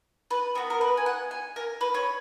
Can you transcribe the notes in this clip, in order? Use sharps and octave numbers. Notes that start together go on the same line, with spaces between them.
B4
B3 F#4 A#4
A#4
B4
G#5
F#5
G#5
A#4
B4
C#5